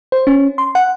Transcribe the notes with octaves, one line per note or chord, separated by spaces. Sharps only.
C5
C#4
C6
F#5